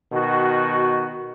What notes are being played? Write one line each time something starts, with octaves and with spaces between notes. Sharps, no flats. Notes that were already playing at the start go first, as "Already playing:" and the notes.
B2 D#3 F#4